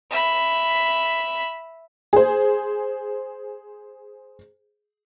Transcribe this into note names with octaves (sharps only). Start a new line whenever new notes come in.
E5 B5
G#4 C5